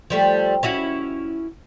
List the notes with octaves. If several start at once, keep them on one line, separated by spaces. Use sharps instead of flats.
F3 G3 A3
C#4 E4 F#4